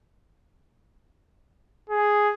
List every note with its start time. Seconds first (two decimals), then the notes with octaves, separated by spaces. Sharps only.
1.89 G#4